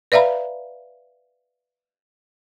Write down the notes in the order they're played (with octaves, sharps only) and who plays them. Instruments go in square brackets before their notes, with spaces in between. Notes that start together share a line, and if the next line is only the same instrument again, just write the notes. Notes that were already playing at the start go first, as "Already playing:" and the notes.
[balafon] B4 D5 E5 F5 A#5 B5